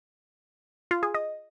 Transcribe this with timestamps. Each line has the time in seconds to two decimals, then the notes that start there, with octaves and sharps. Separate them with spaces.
0.91 F4
1.03 G#4
1.14 D#5